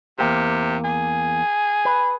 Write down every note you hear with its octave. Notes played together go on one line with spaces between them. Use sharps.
E2 C3 A#3 G4
G#4
B4